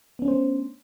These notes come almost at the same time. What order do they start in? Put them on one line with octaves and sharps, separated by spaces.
B3 C#4 D4 C5 A3